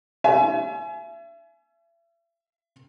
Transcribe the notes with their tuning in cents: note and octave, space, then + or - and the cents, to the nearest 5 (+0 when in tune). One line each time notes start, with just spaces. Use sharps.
E5 +35 G#5 +35